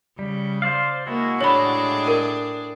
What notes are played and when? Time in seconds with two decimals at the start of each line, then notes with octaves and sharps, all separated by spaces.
0.19 C#3 G3
0.62 C5 D5 F5
1.07 G#3 A#3 E4 F#4
1.41 A2 D4 G#4 C#5 B5
2.08 A#4